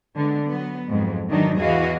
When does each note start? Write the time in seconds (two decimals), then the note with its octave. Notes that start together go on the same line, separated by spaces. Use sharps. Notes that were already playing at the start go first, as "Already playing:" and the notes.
0.16 D3 G#3 B3
0.46 F#3 B3
0.88 F2 G#2 F#3
1.29 D#3 E3 F#3 D4 D#4
1.58 E2 E3 F#4 G#4 D#5 F5